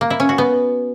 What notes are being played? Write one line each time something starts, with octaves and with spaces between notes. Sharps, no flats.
A#3
E4
C#4
F#4
B3